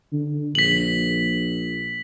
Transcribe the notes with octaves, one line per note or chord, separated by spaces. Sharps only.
D3
A#1 B6 F#7